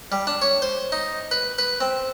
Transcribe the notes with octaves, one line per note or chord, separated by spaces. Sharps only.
G3
D4
C#5
C5
D#4
B4
B4
C4